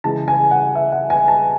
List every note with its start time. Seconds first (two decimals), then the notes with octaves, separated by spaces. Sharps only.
0.04 C#3 E3 G#3 A5
0.28 G#5
0.51 F#5
0.75 E5
0.92 F#5
1.10 G#5
1.28 A5